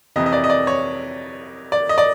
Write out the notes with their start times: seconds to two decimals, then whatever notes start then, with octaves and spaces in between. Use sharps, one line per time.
0.16 F2 C3 E3 D#5
0.26 D#5
0.33 D5
0.44 D#5
0.50 D5
0.67 C#5
1.72 D5
1.89 D#5
1.98 D5